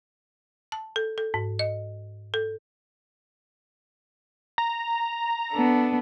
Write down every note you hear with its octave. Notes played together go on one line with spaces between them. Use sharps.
A5
A4
A4
G#2
D#5
A4
A#5
B3 D4 A4